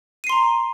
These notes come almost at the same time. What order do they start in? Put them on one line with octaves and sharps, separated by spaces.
D#7 C7 C6 A#5